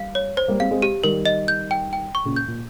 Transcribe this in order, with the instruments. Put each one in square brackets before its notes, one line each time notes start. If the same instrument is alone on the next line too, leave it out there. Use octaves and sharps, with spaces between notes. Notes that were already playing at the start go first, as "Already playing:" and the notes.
Already playing: [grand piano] G3 [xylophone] F5
[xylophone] C#5
C5
[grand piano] G3 A#3
[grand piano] G#3 C4 [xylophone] F5
[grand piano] G#3 C4
[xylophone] G4
[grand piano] D#3 G3 [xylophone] A#4
[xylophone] D#5
G6
G5
G5
C#6
[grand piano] A#2 C#3
[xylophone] G6
[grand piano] A#2